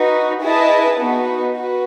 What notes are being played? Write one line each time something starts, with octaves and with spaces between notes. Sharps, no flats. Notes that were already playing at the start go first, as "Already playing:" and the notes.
Already playing: D#4 F#4 B4
E4 G#4 B4 D#5 A5
B3 D#4 F#4 B4
F#4 B4